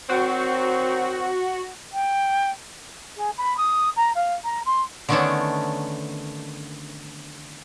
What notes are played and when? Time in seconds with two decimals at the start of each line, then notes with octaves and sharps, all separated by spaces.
0.09 D#3 F#3 C4 F#4
1.93 G5
3.16 G#4
3.38 B5
3.57 D#6
3.96 A#5
4.15 F5
4.44 A#5
4.66 C6
5.09 D3 D#3 A3 B3 C#4 D4